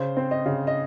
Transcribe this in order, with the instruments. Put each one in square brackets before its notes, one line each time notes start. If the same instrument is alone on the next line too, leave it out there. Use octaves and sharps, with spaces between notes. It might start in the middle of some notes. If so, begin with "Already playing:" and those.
Already playing: [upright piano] C#3 C5
C4
D#5
C#3
D#5